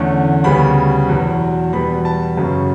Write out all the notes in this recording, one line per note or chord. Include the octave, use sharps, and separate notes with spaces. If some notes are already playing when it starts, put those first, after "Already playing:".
Already playing: E2 D3 A3 C#4
D2 C#3 G3 B3 B5
E2 B2 F#3
E2 B2 G3 B3 B5
A5
F#2 C#3 F#3 C#4